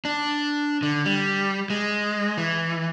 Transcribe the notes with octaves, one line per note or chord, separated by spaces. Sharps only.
D4
D3
G3
G#3
E3